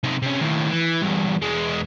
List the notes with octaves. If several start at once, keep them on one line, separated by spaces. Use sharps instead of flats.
C3 D#4
C3 C#4
D#2 A2
E3
E2 G2
E2 G#3